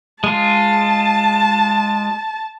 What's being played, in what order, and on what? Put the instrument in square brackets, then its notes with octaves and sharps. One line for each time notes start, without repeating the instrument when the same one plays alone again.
[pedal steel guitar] G#3 F4 [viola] A5